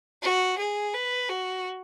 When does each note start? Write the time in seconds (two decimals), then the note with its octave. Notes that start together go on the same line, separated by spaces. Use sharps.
0.23 F#4
0.58 G#4
0.94 B4
1.30 F#4